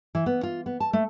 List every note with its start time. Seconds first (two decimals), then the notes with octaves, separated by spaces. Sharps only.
0.15 E3
0.26 B3
0.43 F4
0.66 B3
0.80 A5
0.93 A3